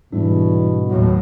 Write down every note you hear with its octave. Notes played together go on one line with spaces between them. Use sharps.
E2 G#2 B2 G3 D4
D#2 A2 F#3